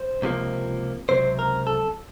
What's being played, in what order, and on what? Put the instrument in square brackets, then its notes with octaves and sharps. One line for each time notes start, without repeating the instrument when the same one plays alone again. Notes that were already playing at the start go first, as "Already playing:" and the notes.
Already playing: [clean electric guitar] C5
C#2 C3 F3 A#3
C#2 C3 F#3 C4 C5
A#4
A4